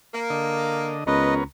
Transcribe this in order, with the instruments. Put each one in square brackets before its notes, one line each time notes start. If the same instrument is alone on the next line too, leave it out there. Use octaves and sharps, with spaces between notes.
[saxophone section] A#3
[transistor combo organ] D3 D#5
[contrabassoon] C#2 [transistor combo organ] B3 A#4 C#5 [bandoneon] B4 D#5